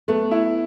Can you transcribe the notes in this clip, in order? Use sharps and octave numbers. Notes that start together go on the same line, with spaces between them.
F#3 A3 B3
E4